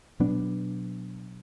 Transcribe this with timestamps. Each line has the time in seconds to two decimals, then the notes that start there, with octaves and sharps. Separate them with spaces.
0.20 B2 F#3 B3 D4